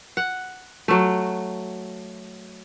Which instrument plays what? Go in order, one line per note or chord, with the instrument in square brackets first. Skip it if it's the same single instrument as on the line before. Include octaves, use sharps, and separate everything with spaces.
[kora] F#5
F#3 A3